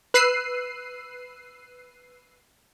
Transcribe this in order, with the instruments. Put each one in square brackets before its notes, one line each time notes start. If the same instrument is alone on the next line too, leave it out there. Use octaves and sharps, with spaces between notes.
[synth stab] B4 E6 F#6 C7 D#7